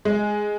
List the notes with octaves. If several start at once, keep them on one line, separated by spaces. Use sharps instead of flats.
G#3